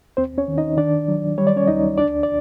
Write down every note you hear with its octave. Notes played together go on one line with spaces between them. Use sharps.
D#2 C4 C5
C#4 C#5
D#3
D#4 D#5
D#3 D4 D5
F#3
G3 C#5
D5
C#4 C#5
C#2 D#4 D#5
D2 D4 D5
D5